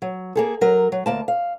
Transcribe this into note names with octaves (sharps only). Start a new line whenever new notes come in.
F#3
A#3 G#4 A4
F#3 A#4
F#3
D2 A#3 A5
F5